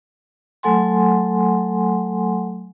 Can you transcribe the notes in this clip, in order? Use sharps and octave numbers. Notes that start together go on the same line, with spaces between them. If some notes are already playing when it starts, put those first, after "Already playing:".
F#3 A3 A4 F#5 G#5 C6